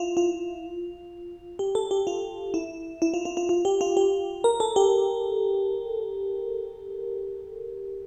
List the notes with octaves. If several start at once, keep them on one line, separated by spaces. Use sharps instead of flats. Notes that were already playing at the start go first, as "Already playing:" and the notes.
Already playing: E4 F4
F4
G4
A4
G4
F4
E4
E4
F4
F4
F4
F4
G4
F4
G4
A#4
A4
G4